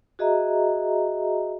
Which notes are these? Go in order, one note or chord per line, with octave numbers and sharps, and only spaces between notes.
F#4 G#4 D#5 E5 A#5